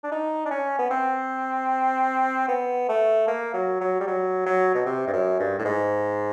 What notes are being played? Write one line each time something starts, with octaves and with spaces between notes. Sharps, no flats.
D4
D#4
D4
C#4
B3
C4
B3
A3
A#3
F#3
F#3
G3
F#3
F#3
B2
C3
G2
F#2
G2
A2
G#2